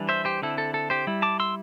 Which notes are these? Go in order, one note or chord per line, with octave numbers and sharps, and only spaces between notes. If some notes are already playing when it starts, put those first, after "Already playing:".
Already playing: E3 G3 D4
C5 E5
G4 C5
D3 C4 E4 A4
A4
A4
G4 C5
G3 E4
A5 D6
C6 E6